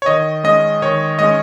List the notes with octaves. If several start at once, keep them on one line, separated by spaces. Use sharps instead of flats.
C#5
D#3 D#5
G#3 C#4 D#5
D#3 C#5
G#3 C#4 D#5